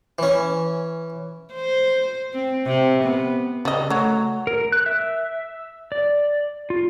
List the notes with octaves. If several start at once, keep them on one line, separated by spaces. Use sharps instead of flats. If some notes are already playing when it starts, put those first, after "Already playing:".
E3 C#4
C5
C4
C3
B3
C#3 G3 D#5
F#3 A3
A#4
F#6
E5
D5
F4